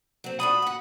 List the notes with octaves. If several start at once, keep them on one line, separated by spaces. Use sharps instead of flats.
F#3 C4
A3 D4 F#4 B5 D#6
F#4 F#5